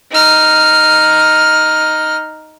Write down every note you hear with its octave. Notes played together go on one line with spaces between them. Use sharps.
D#4 F6